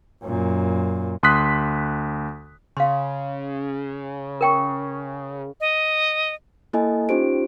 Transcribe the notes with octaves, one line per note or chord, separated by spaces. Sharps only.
F#2 A#2
D2 C6 D#6 F#6 B6
C#3 F5 C6
A#4 G5 C#6
D#5
A#3 E4 A4 D#5 G#5
C#4 D#4 F4 G4 C5 D7